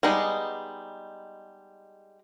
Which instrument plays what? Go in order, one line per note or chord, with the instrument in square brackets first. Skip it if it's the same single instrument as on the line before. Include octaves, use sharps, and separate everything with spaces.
[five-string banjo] G3 G#3 B3 D#4 G#4